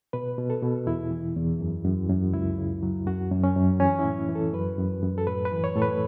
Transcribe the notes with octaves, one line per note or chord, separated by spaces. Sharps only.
B2 B4
B2
A4
B2
E2 E4
E3
E2
F#2
F#2
F#2
C#2 E4
C#3
F#3
F#2 F#4
F#2
C#4
F#2
E3 C#4
E4
A2
E3
A4
F#2 B4
F#2
F#2
A4
A2 B4
B4
E3
C#5
A2 A4
B4